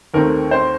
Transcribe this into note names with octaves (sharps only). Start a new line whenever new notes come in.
D#2 D#3 A3 C4 A#4
C5